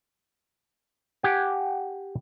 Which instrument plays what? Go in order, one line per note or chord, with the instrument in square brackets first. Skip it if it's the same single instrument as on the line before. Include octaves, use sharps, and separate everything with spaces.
[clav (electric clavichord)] G4 F#5 G#5